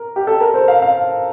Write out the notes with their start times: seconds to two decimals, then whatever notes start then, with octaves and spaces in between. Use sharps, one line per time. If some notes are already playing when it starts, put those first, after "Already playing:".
Already playing: A#4
0.16 G4
0.27 A4
0.41 A#4
0.54 C5
0.68 F5
0.82 F5